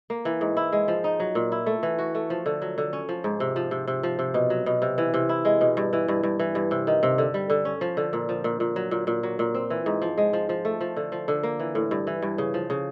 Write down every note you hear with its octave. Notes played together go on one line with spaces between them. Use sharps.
A#3
E3
G#2
E4
G#3
F3
D#4
F#3
A#2
E4
A3
E3
F#4
A3
F3
D3
F#3
D3
C#4
F3
G#2
C3
F3
C3
C3
F3
C3
B2
F#3
B2
C3
E3
C3
E4
G#3
B2
G2
E3
G2
G2
E3
G2
C3
D#3
C3
D3
G3
D3
C#4
F3
D3
A#2
F3
A#2
A#2
F#3
A#2
A#2
F#3
A#2
C4
E3
G#2
F3
G#3
F3
F3
A3
F3
D3
F3
D3
A#3
E3
A2
G2
E3
G2
C#3
F3
C#3